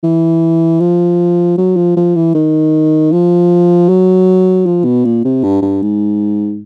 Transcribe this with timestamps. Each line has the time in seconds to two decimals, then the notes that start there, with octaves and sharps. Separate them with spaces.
0.03 E3
0.80 F3
1.58 F#3
1.76 F3
1.96 F3
2.16 E3
2.35 D#3
3.12 F3
3.89 F#3
4.66 F3
4.84 B2
5.05 A#2
5.24 C3
5.44 G2
5.62 G2
5.82 G#2